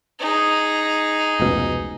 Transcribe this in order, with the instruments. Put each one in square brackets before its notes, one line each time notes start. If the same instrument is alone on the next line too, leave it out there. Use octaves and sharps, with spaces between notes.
[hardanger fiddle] D#4 G#4
[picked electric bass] F1 C#2 B2